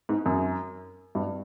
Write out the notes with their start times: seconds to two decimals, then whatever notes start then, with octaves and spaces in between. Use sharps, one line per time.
0.09 G#2
0.26 F#2
1.15 G2